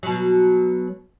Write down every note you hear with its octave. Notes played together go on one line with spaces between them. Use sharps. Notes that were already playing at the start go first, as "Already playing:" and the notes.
B2 F#3